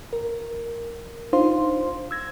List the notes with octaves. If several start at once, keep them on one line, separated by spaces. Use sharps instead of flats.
A#4
D4 D#4 F4 C5 F5 C6
E6 G#6 A#6